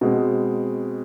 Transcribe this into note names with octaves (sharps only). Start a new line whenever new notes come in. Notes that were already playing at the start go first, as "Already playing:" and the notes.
B2 G#3 C4